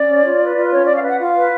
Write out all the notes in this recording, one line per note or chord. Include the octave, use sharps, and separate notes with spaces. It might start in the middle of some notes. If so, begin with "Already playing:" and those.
Already playing: C#4 D5
C#5
F4
B4
F4
C#4 C#5
C#4 D5
F5
B4 F#5
F4 F5
B4